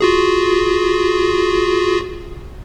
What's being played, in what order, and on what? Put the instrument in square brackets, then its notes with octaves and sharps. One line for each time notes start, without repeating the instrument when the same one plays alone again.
[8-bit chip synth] F4 F#4 G#4